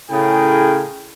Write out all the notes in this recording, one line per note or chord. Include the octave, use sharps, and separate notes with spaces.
A2 C#3 G#4 A#4 G5